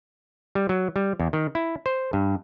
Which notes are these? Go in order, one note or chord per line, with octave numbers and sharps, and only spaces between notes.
G3
F#3
G3
E2
D#3
E4
C5
G2